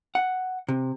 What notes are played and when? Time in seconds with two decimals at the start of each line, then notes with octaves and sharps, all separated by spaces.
0.15 F#5
0.68 C3